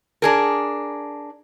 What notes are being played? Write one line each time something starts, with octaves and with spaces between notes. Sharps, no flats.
D4 G#4 A#4